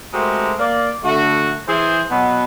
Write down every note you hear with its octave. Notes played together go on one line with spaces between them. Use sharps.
G#3 A3 C4 F#4 G4 A#4
A#3 D5
D3 A3 F#4
E3 G#4 C5
B2 F#3 B3